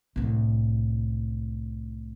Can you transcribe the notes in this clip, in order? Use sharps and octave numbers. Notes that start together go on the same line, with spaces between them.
C2 A2